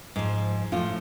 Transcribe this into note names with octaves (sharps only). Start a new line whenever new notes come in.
G#2 F3
A2 F3 F4